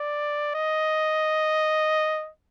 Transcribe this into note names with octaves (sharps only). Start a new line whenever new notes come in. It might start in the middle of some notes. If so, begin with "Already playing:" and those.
Already playing: D5
D#5